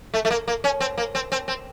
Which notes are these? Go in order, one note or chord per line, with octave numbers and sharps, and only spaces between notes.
A3
A3
A#3
A#3
C#4
C4
A#3
C4
C4
C4